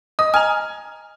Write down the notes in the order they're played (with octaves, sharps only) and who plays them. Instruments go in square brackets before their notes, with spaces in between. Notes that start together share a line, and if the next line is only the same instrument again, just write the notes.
[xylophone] D#5 [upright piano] D#6
[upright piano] G#5 [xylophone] A#5 F6